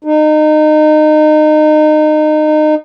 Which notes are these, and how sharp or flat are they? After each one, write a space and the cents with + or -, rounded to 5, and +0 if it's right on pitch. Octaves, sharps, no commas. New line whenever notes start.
D#4 -25